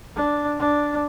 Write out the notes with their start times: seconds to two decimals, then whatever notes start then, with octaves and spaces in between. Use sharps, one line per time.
0.16 D4
0.59 D4